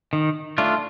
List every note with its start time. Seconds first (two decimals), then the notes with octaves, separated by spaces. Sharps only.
0.13 D#3
0.58 A3 D4 F4